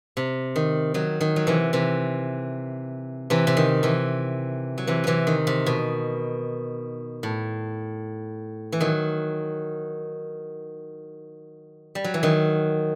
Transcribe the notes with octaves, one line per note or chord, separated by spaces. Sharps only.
C3
D#3
D#3 F#3
D#3
F#3
C3 E3
C3 E3
C3 E3
C3
D#3
C3 E3
F#3
C3 E3
C3 E3 F#3
D#3
C3
B2
A2
E3
D#3 F#3
G3
F#3
E3
D#3 F#3